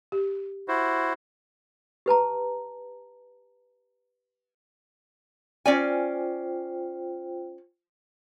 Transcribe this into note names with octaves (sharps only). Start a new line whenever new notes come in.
G4
E4 F#4 C5
G4 B4 A5 A#5
C#4 F4 C5 D5 G5 G#5